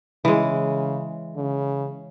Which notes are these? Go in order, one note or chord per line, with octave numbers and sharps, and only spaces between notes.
C#3 E3 G#3
C#3